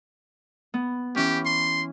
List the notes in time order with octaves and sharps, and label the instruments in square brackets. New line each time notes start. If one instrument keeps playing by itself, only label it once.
[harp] B3
[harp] E3 C#4 [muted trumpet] G4
[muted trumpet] C6